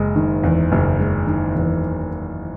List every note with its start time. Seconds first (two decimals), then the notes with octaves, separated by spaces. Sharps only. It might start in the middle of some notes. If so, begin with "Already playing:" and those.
Already playing: F#1 G#3
0.16 D#3
0.43 E2
0.72 F#1
0.99 G#3
1.27 D#3
1.55 E2